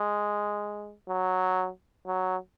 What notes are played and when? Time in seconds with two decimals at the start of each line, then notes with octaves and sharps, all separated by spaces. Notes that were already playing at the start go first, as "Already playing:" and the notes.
Already playing: G#3
1.09 F#3
2.07 F#3